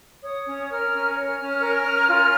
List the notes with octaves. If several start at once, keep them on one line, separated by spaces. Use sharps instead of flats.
C#5 D#6
C#4
A#4 F6
C#4
C#5 F6
C#4
A#4
C#4
F4